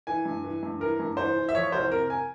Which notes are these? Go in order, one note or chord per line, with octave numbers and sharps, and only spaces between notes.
E3 G#5
G2
E3
G2
E3 A#4
G2
E3 C5
E3
E5
F3 C#5
C2 C5
C3 A#4
G#5